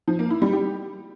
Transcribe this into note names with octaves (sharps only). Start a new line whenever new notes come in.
F3
A#3
E4
G3
G4